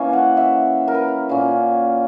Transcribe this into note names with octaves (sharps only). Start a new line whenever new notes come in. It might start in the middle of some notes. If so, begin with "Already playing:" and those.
Already playing: E3 A#3 C#4
F#5
E5
A#4
B4
A#2 A#3 C#4